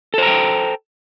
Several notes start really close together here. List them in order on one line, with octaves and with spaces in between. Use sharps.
A4 C5 A#5 G5